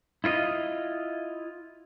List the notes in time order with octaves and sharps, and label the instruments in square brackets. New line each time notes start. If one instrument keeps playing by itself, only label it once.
[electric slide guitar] E4 F4 C5 D#5